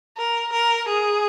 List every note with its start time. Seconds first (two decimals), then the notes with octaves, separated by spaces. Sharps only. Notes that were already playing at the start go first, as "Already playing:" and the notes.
0.17 A#4
0.52 A#4
0.88 G#4